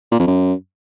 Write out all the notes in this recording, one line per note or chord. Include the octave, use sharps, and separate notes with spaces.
A#2
F2
F#2